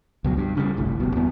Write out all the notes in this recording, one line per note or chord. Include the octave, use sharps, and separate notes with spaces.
C#2 B2 F#3
G2
C#3 G3
G1 C2 A2
F1 B2
E2 B3